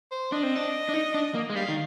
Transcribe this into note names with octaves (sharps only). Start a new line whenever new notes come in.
C5
D4 D#5
C4
D4
D4
D#4
D4
A#3
G#3
G3 F5
D#3